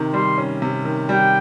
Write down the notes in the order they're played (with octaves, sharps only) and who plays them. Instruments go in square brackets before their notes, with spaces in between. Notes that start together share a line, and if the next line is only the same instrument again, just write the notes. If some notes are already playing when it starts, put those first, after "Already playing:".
Already playing: [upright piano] C3 D#3
[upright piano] G3 [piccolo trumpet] C6
[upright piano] C#4
C3
D#3
[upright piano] G3 [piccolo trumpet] G5